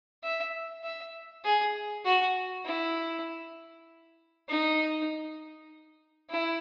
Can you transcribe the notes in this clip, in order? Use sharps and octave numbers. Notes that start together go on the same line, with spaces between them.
E5
E5
G#4
F#4
E4
D#4
E4